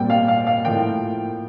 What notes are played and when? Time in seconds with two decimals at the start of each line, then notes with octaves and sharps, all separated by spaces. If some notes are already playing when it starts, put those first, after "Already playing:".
Already playing: A#2 G3 C4 G5
0.10 F5
0.28 F5
0.47 F5
0.65 A2 F3 A#3 G5